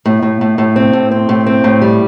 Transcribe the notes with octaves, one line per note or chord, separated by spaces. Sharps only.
A2
A2
A2
A2
C4
A2
C4
A2
C4
A2
G3